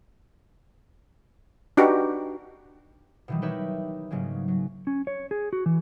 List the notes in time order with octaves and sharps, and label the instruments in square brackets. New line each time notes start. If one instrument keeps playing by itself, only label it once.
[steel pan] D4 D#4 F#4 G4 B4
[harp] B2 D#3 E3 F#3 G3
D#4 G4 A#4 B4 C#5 E5
G#2 C#3 F#3 A#3 C#4
F#3
[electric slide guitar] C#4
C#5
G#4
F#4
E3